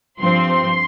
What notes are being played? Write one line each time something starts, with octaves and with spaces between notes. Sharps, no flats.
G2 F3 C4 C6